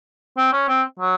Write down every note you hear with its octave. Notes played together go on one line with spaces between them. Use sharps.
C4
C#4
C4
F#3